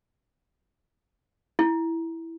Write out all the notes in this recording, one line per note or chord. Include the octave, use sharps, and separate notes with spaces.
E4